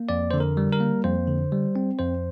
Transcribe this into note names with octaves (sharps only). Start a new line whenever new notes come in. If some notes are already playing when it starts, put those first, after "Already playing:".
Already playing: A#3
F2 D5
D3 C5
A#4
G3
A#4
A#3
F2 C5
D3
G3
C4
F2 C5